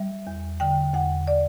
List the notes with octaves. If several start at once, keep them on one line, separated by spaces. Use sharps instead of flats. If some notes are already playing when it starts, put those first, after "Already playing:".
Already playing: G3 E5
E2
D3 G5
E2 F#5
D5